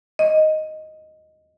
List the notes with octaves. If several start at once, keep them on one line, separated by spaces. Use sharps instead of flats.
D#5